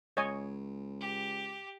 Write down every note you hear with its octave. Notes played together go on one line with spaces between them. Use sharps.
C#2 C#5 D#5 G#5
G4